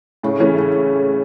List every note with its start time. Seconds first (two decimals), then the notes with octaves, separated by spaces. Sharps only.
0.23 A2 C#3
0.40 E3 A3 C#4
0.55 A2